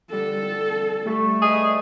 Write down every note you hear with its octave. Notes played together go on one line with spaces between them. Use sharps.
D3 G3 A4
G3 A3
G#4 B4 D5 D#5